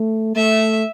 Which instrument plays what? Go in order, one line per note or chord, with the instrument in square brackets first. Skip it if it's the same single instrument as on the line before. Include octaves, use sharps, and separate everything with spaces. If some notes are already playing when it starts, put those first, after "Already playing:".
Already playing: [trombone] A3
[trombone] A3 [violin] E5